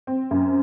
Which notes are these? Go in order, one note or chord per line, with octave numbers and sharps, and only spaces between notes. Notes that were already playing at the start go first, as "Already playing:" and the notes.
C4
F#2